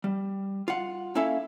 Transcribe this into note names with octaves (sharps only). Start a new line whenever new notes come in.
G3
F4 F#5
A#3 C#4 E4 A4 E5 F5